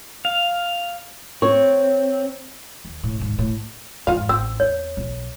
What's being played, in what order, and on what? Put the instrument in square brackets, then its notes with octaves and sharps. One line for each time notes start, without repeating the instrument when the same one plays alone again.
[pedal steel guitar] F5
[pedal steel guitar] C4 [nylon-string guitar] C#5
[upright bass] D#2
A2
D#2 G#2
A2
[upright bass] F2 G#2 [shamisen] F4 F5
[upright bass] A1 [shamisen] C4 [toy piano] E6
[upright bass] E2 [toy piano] C#5
[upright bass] B1